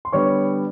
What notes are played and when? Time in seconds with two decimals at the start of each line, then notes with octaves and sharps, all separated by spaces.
0.05 C6
0.13 D3 G3 B3 C#5 C#6